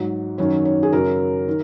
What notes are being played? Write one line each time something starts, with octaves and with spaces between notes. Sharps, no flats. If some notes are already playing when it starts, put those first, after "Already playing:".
Already playing: G#2 F#3
F#2 D#3 F#3 C#5
C#5
G#4
F#2 C#3 F#3 A#4
D#3